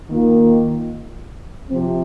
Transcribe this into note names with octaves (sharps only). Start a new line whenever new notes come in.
D#3 A#3 F4
C3 F3 C4